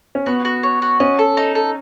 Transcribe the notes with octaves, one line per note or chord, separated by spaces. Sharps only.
C#4
B3 F#4
F#4
C#5
F#4
C#4 D#5
A4
D#4
A4